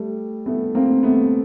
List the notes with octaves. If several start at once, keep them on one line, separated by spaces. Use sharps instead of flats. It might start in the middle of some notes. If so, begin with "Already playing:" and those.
Already playing: G3 A3
A3 B3
A#3 C4
A3 B3